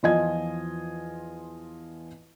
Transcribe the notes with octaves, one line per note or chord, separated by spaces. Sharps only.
E2 F3 F4 D#5 G#5 G#6